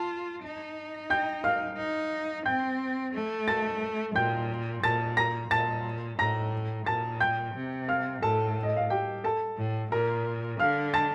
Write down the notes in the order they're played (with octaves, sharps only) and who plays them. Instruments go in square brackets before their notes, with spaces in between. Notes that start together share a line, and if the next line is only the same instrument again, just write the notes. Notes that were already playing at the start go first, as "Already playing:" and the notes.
Already playing: [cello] F4 [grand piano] A5
[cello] D#4
[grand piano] G5 G6
F5 F6
[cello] D#4
[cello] C4 [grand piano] G5 G6
[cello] A3
[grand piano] A5 A6
[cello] A#2 [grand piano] G5 G6
[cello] A#2 [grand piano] A5 A6
[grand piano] A#5 A#6
[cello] A#2 [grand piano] A5 A6
[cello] A2 [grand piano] A#5 A#6
[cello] A#2 [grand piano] A5 A6
[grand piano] G5 G6
[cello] C3
[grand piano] F5 F6
[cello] A2 [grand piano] A4 A5
[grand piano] D#5
F5
G4 G5
A4 A5
[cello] A2
[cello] A#2 [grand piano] A#4 A#5
[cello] D3 [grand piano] F5 F6
[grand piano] A5 A6